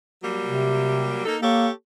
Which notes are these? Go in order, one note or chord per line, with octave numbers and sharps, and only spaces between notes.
F#3 G3 A#3
C3
A#3 D#4 A4
A#3 G4 A4 C#5